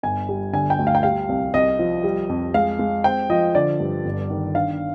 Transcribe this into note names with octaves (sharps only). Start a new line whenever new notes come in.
G1 G#5
G3
D3 G#5
G5
D2
F5
G5
G3 F5
C2
C2 D#5
F3
G3
F2
G#3 F5
G#3
C4 G5
F3 D#5
D3 D5
G2
G1
D#3
D4 F5